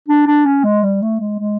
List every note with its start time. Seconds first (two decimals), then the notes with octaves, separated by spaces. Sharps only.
0.08 D4
0.26 D4
0.46 C#4
0.64 G#3
0.83 G3
1.02 A3
1.20 G#3
1.39 G#3